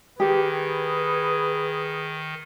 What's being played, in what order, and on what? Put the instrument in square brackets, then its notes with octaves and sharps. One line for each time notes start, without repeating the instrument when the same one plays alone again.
[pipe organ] D#3 [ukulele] G4 [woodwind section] G#4 [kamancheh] B4